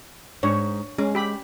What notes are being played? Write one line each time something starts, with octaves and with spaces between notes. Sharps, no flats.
G#2 D4 C#5
G#3 C#4
G4 B5